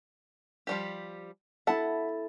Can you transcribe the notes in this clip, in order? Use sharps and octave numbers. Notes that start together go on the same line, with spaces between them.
F3 G3 G4
E4 A4 E5 F#5 A5